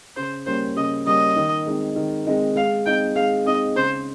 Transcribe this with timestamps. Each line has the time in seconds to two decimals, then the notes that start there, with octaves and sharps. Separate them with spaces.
0.16 C#3 C5
0.46 G3 A#3 C#4 C5
0.76 C#3 D#5
1.06 G3 A#3 C#4 D#5
1.36 D#3
1.66 G#3 C4 D#4
1.96 D#3
2.27 G#3 C4 D#4
2.56 G#3 F5
2.85 C4 D#4 G5
3.15 G#3 F5
3.45 C4 D#4 D#5
3.76 C#3 C5